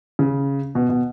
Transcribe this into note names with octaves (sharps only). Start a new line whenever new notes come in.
C#3
B2
B2